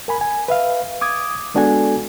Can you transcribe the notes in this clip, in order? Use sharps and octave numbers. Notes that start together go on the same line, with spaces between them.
A#4 G#5 B5
G#5
B4 E5 F5
D6 D#6 G#6
G#3 B3 D4 F#4 A4 G#5